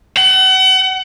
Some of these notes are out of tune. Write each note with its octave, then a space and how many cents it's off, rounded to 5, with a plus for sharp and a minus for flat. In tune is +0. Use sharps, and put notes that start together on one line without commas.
F#5 +35